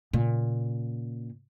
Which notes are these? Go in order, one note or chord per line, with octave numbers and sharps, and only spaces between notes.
A#2 C#3